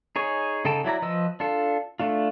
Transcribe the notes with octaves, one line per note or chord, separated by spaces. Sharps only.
D#4 G#4 C#5
C#3 D#4 A4 G5 A5
F#3 E4 D5 A#5
F3 B4 D#5 E6
D4 F4 A4
A3 D4 F4